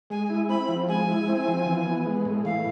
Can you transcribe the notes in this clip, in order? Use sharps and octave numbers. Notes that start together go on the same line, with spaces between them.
G#3 G#5
E4
C4 B5
F3
G#3 G#5
E4
C4
F3
E3
B3
G#3
A2
E3 F5